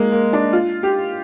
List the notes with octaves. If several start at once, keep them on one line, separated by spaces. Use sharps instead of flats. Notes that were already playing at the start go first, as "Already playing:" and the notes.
Already playing: G#3 A#3
A#3
D4
F4
G4